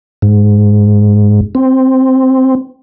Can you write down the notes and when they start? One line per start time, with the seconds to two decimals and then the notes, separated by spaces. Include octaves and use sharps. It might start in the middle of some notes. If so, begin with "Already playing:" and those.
0.22 G#2
1.55 C4